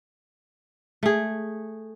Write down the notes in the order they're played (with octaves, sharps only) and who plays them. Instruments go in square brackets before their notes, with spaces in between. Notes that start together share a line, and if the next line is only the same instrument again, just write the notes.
[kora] A3 G#4